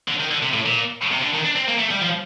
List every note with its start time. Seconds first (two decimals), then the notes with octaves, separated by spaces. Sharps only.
0.08 D3
0.20 D#3
0.31 D3
0.43 C3
0.54 A2
0.66 A#2
1.11 C3
1.22 D3
1.34 D#3
1.44 D4
1.56 C4
1.68 A#3
1.78 A3
1.91 G3
2.02 F3